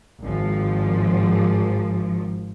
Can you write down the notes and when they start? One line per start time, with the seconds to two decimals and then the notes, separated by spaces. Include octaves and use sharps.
0.23 G#1 F3